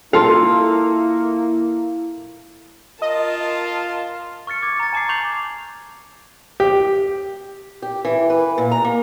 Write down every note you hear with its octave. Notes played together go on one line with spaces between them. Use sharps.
A#3 E4 F4 A4 F5
F4 A#4 D#5 A5
C#6 F6 A6 C#7
D6 G#6
A#5 A6
G#5 A5 D6 G#6 C7
C#6 G6 C7 F7 F#7
G4
G4
E3
B4
A#2
A#5
A#3